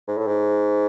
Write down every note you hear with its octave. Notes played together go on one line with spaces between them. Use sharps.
G#2
A2
G#2